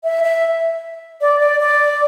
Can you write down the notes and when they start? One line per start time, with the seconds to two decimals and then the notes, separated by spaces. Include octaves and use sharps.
0.04 E5
0.24 E5
1.21 D5
1.40 D5
1.60 D5